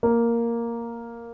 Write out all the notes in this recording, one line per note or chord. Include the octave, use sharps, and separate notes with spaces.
A#3